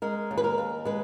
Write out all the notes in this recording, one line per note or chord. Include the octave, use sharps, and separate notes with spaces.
G#3 A#4
D#2
B4
A#4
D#2
G#3 B4